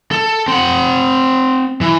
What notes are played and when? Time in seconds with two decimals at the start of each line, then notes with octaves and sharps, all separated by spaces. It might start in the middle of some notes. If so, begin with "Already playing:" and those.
0.11 A4
0.48 C4 F#5
1.81 E3